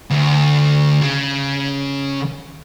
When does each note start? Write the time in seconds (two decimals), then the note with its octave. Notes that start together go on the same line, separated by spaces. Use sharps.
0.10 D2
1.01 C#3